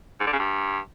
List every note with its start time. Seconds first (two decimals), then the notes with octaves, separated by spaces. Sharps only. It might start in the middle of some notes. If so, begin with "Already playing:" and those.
0.20 G#2
0.27 D3
0.33 C#3
0.39 G2